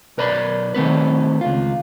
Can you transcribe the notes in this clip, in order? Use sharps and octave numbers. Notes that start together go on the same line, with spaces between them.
B1 A#4 B4 D5 B5
D#3 A3 C4 B4
C#2 F4